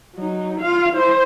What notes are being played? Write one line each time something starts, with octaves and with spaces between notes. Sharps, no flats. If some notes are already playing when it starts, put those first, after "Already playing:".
F#3 D#4
F4 F5
E4 C5